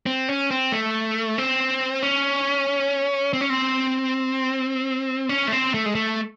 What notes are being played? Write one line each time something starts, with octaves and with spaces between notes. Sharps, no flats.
C4
C#4
C4
A3
C4
C#4
C4
C#4
C4
C#4
A3
C4
A3
G#3
A3